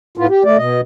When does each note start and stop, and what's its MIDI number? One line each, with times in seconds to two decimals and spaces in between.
0.18 0.27 45
0.18 0.27 59
0.18 0.27 65
0.29 0.43 67
0.45 0.57 57
0.45 0.57 74
0.57 0.81 47
0.57 0.81 75